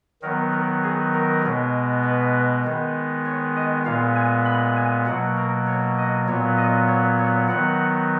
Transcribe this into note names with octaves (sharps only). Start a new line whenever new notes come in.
D#3 F#3 B3 A#4
A#4
G#4
A#4
B2 G#3 B3
B4
D#3 G#3 B3
C#5
D#5
A#2 G#3 B3 F5
G#5
B5
G#5
B2 F#3 A#3 F#5
A#4
C#5
D#5
A#2 F#3 B3 C#5
D#5
C#5
C#5
D#3 F#3 B3 F#5